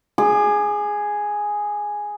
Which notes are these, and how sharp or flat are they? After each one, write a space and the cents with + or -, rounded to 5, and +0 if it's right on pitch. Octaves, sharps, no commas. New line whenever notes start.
G#4 +0 D6 +45